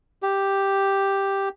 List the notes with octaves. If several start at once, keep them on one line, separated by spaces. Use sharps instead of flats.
G4